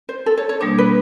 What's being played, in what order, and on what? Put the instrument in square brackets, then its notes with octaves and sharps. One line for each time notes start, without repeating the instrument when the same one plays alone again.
[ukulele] C5
A4
C#5
C#5
[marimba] B2 G3 A#3 D4 [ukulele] C5
[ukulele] B4